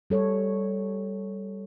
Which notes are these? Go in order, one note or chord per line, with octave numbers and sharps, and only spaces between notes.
G3 A4 C#5